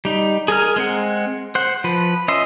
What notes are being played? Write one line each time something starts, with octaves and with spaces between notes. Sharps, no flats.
G3 D#4
G#4 A#4 G#5 F6
G#3 C4 F#5
C5 F#5
F3 B4
C#4 D#5 E5 C6